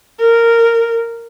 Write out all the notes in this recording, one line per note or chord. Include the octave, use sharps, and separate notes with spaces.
A#4